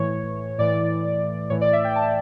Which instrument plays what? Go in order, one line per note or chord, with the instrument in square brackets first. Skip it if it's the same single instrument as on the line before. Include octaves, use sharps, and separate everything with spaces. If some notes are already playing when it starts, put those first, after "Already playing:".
Already playing: [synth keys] A2 E3 C#5
A2 E3 D5
A2 E3 C#5
D5
E5
G5
A5